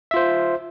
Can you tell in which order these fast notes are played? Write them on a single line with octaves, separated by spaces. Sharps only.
E5 F4 C5